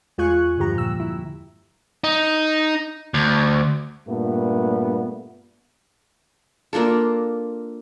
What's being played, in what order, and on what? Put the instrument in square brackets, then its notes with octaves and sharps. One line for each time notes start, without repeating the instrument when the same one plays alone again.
[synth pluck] E2 G#3 F4 G#5 C#6 F#6
G2 D3 F3 G4 A#5
A#2 E6
E4
[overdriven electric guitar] D#4
D2
[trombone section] G2 A#2 A3 B3
[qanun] A#3 D4 F4 A4